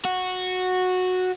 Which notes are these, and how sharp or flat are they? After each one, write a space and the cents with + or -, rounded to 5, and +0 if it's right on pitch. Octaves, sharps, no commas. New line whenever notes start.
F#4 -10